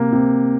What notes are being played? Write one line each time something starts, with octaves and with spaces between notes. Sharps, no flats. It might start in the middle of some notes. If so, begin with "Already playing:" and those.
Already playing: C3 A#3
C3